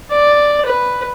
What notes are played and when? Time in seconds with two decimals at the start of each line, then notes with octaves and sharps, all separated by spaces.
0.11 D5
0.66 B4